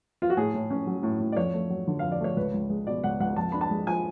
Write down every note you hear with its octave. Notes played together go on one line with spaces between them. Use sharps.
F4
F#4
A2 G#4
A2
C#4
F#3
A2
A2
D5
F2 C#5
A3
F#3
D3
F2 F5
D5
A3 C#5
C#2 B4
C#2
G#3
B2 D5
C#2 F#5
C#2 F#5
F2 A5
D4 B5
A5
G#3
F3 G#5